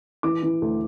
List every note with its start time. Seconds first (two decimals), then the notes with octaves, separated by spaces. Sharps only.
0.23 E3 D6
0.43 E3
0.62 D2